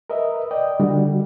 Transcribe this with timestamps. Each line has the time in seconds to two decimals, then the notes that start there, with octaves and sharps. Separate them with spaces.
0.10 A#4 B4 D#5 E5
0.51 D5 D#5 G5
0.80 D3 G3 F#4